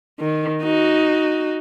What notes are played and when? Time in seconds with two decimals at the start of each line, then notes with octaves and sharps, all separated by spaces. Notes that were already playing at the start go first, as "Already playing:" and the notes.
0.19 D#3
0.64 D#4 F#4